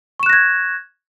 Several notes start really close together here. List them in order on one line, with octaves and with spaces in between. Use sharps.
C#6 E7 F#6 A#6 G#6